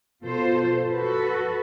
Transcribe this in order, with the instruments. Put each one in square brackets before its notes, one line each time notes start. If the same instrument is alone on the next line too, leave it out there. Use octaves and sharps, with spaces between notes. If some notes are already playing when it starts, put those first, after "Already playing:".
[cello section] B2 F4 A4 C5
F#4 A4 B4